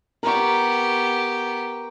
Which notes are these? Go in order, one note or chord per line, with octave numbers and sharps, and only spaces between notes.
B3 G4 A#4 C#6